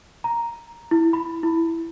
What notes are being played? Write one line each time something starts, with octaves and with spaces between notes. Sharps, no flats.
A#5
E4
B5
E4